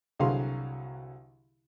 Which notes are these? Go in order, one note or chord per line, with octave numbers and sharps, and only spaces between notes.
C2 D3 F#3 G#4 F5 C6